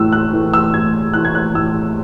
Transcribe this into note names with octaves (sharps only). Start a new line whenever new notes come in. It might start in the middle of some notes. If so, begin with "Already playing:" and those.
Already playing: A2 E3 A3 E6 F#6
F#6
E3 A3
E6
A2 G#6
E3 A3 F#6
G#6
F#6
A2 E6